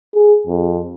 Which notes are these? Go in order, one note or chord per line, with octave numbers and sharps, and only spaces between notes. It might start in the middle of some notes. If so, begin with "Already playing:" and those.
G#4
F2